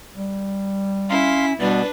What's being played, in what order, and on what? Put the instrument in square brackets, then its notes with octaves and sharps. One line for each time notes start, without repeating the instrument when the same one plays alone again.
[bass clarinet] G3
[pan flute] C#4 [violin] E4 B6 [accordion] F5 C6
[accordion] B2 B3 [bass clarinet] G3 [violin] D4 B4 [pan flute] D5